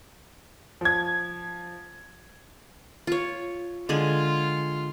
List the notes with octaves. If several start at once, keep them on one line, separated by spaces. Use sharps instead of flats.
F3 G#6
F4 C#5
D3 G#3 F4 G#4